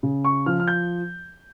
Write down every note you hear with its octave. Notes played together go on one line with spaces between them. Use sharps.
C#3
C#6
F3 F6
F6
G6